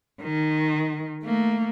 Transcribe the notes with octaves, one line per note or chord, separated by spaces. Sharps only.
D#3
A3 A#3